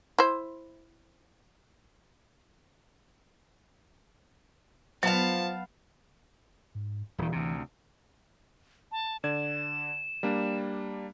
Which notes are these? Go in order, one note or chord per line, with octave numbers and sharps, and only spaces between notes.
E4 C5
F3 F#3 B3 F5 A5
G#2
D#1 D#3 E3
D2 C3
A5
D3 D5 G#6 E7
G3 A#3 D4